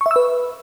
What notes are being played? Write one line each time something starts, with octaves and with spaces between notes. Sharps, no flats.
C#6
E5
E6
B4